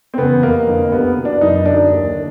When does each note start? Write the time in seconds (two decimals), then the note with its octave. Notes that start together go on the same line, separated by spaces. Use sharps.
0.14 C4
0.18 E2 C#3 B3
0.43 F1 A#3
0.67 F2 D3
0.92 C2 B3
1.17 B2
1.25 D4
1.41 F#1 D#4
1.65 F#2 D3 D4
1.91 D#2
2.15 D3